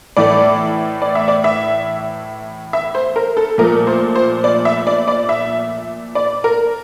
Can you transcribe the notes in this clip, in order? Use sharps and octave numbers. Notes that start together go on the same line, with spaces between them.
A2 E3 A3 D5
D5
E5
D5
E5
E5
C5
A#4
A4
A#2 F3 A3 A#4
C5
C5
D5
E5
D5
D5
E5
D5
A#4